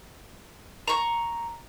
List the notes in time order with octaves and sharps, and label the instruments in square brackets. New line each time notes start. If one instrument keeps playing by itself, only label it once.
[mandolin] A#5 C#6